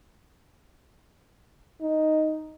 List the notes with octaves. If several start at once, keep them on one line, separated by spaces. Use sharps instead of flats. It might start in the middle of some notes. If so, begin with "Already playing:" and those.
D#4